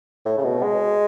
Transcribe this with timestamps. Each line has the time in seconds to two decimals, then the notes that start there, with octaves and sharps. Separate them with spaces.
0.25 A2
0.38 C#3
0.44 B2
0.63 G#3